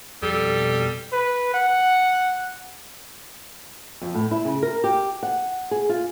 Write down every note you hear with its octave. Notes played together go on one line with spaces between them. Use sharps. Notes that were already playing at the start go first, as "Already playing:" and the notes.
F2 B2 G3 A4
B4
F#5
F2
A2
E4
C#3
A#4
G4
F#5
G#4
F4